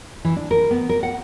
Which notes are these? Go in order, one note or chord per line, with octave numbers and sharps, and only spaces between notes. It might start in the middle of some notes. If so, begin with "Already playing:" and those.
E3
D4
A#4
B3
A#4
F#5